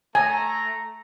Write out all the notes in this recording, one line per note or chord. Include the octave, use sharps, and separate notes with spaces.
A3 G#5 A#5